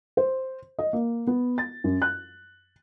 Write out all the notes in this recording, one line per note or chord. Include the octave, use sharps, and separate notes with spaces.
C5
D#5
A#3
B3
A6
F#2
F#6